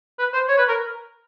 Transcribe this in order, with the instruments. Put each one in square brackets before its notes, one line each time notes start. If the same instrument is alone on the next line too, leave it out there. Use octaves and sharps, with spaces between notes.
[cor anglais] B4
C5
C#5
B4
A#4